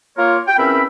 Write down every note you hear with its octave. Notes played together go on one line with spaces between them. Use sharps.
A#3 F4 A#4 C#5
G5
E2 C4 C#4 A#4 E5 B5